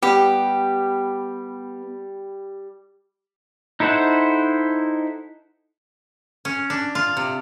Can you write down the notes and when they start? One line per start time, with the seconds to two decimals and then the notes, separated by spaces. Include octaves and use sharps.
0.02 G3 B3 G4
3.80 D#4 E4 A4 C5 F#5
6.45 C#4
6.70 D4
6.95 F4
7.17 C3